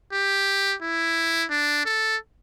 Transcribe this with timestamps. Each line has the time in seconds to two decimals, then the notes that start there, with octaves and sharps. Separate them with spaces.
0.13 G4
0.82 E4
1.50 D4
1.85 A4